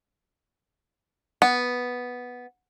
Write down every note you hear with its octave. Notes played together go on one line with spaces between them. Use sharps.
B3